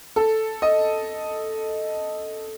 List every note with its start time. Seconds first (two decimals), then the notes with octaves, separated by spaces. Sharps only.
0.16 A4
0.62 D#5